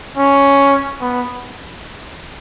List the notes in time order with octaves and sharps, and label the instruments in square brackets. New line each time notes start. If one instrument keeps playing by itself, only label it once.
[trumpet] C#4
B3